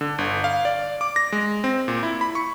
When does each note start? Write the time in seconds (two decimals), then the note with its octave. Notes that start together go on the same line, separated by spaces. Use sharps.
0.01 D3
0.18 G1
0.44 F5
0.65 D5
1.01 D6
1.16 A#6
1.32 G#3
1.64 C4
1.88 A#2
2.03 E4
2.21 B5
2.35 C#6